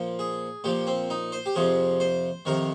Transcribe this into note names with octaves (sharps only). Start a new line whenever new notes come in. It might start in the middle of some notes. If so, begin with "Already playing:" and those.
Already playing: A#2 F3
G#4
A#2 F3 G4
C4
D#4
C5
G4
F2 C3 F3 G#4
C5
F2 C3 D#3 A#4